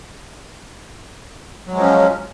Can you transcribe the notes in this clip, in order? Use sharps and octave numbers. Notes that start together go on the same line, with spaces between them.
F3 F#3 G#3 C#4